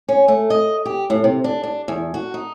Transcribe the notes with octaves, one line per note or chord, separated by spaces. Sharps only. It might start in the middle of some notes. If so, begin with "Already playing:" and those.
C#4
A3
D#5
G4
A2
C3
D4
D4
E2
F#4
D#4